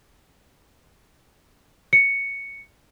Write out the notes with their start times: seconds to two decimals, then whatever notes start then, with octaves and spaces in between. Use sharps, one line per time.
1.93 C#7